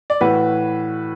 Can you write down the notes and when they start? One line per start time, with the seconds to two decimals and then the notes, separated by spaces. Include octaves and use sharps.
0.10 D5
0.21 A2 E3 F#4 B4